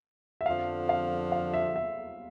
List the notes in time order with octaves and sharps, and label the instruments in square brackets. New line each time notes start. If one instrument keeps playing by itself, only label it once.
[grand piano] E5
[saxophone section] F2 D3 F3 [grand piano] F5
[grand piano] F5
F5
E5
E5